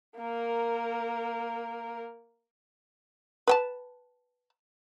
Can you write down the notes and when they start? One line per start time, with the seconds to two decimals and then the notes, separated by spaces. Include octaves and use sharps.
0.18 A#3 A#4
3.48 B4 G5 A5